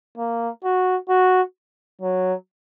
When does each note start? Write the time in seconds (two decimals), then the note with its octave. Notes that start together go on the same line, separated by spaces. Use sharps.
0.18 A#3
0.64 F#4
1.09 F#4
2.01 F#3